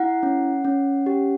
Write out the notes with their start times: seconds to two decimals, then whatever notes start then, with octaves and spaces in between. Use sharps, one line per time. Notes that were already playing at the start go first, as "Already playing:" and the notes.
Already playing: E4 F#5
0.23 C#4
0.65 C#4
1.06 G4